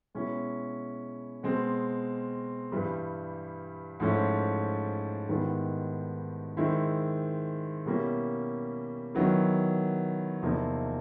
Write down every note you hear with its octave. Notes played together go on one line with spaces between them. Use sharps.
B2 G#3 C#4 E4
B2 G#3 C4
G2 E3 G3
G#2 F3 A3 C#4 E4
G#2 D#3 G3 B3 E4
D#3 G#3 C4 E4
B2 G3 A#3 C#4 E4
D#3 F#3 B3 E4
E2 C3 F3 A#3 D#4